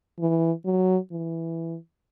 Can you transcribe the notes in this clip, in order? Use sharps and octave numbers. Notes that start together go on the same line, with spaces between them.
E3
F#3
E3